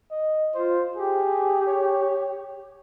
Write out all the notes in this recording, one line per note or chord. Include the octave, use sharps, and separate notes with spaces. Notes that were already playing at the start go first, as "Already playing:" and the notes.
D#5
F4 C5
G4 G#4
C#5